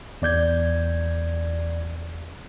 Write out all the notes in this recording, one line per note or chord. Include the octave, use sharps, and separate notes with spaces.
E2 D5 G6 G#6